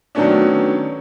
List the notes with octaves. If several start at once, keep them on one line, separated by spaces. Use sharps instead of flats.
D#3 F#3 A3 B3 C#4 D4